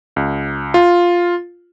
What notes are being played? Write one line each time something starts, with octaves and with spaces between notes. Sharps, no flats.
C#2
F4